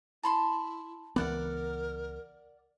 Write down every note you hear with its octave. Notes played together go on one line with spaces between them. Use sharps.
E4 A5 B5 C6
C#2 E3 B3 A#4 D5 F#5